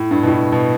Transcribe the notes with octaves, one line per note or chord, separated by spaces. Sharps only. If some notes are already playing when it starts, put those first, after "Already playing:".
Already playing: A2
G2
B2
A2
B2